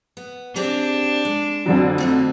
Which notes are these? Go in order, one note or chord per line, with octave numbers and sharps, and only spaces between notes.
B3
C4 D4 G4 G#4
G#3
F2 D3 F#3
A3 C4 D#4